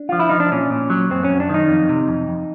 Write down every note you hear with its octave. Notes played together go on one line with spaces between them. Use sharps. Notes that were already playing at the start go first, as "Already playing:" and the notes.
Already playing: D4
F3 F4
E4
F3 D#4
D4
A#2 C#4
A#2
F#3
F#2 C4
F#2 C#4
D4
D#3 D#4
F2
C3
F2
F2